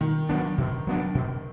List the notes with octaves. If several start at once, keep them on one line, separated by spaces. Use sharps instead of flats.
B2 D#3
F#3 B3 D4
B2
F#3 B3 D4
B2